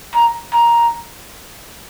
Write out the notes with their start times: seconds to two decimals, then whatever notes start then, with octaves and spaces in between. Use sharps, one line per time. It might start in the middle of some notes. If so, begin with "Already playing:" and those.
0.15 A#5
0.53 A#5